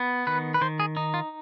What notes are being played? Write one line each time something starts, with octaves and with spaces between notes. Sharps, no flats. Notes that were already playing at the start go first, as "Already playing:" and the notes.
Already playing: B3
D#3 B4
B4
D#3 C5
G#4
D#4
F4